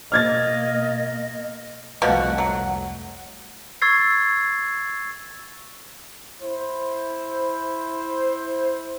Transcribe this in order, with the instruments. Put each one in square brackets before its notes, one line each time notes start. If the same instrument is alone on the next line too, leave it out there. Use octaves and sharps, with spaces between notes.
[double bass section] B2 A#3 [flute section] D#5 [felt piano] F6 G#6 A6
[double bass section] C2 F2 A3 [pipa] B2 F3 F#4 [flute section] F#5
[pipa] F#3
[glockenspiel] C#6 E6 G#6 A6 C7
[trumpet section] E4 C5